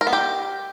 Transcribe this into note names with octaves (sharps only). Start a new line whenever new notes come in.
A#4
B3
G4